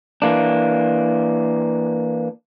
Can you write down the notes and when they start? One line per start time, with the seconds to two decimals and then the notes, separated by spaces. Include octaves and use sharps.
0.22 E3 A#3 D4